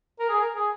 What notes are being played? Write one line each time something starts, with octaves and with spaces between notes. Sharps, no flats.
A#4
G#4
A#4
G#4